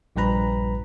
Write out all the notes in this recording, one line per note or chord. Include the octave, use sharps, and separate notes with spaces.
A#1 G2 F3 B4 A#5 B5